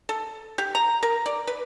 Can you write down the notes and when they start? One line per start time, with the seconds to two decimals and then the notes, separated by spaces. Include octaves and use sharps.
0.09 A4
0.58 G4
0.75 A#5
1.03 A#4
1.26 D5
1.47 B4